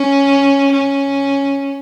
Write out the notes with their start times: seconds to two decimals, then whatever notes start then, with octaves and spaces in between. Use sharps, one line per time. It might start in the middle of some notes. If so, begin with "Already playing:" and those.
Already playing: C#4
0.72 C#4